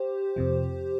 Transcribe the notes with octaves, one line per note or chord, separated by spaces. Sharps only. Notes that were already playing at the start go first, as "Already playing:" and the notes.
Already playing: G4 C5
F2 C3 F3